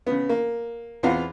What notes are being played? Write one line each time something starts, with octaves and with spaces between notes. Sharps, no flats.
C#3 B3
A#3
E2 B3 C4 F4 F5 F#5